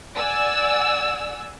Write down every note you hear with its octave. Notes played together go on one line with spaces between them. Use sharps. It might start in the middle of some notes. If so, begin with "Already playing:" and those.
D5 F#5 G#5 E6